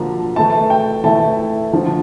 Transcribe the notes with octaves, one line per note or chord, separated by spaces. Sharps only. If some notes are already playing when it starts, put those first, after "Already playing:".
Already playing: D3 F3 A#3 D4 A#5
E3 A3 E4 A5
G5
E3 A3 E4 A5
D3 F3 A3